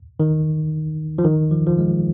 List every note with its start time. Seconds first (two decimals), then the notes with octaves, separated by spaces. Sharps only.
0.20 D#3
1.18 F3
1.24 D#3
1.51 F3
1.67 F3
1.78 G#3